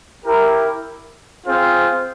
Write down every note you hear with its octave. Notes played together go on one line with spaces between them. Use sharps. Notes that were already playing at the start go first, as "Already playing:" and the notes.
E4 G4 A#4
C4 F4 G#4 C5